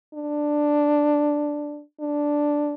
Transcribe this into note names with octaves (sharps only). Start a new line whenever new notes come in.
D4
D4